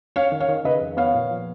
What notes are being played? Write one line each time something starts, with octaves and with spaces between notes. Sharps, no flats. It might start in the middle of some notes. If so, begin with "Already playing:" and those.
C#4 C#5 F5
D#3
C#5 F5
D#3
C#3 B4 D#5
F2
B3 C#5 F5
A#2
F3